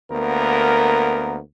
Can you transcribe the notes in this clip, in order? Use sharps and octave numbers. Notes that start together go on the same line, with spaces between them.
D2 A#3 B3 A#4